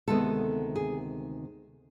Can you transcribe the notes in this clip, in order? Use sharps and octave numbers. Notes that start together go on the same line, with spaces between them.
D2 C3 D#3 G#3 B3 A4
G#4